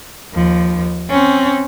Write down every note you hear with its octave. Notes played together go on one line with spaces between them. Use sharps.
D#2 F3
C4 C#4